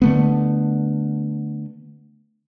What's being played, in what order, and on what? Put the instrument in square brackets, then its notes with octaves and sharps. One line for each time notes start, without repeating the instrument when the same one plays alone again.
[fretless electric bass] D3 A3 B3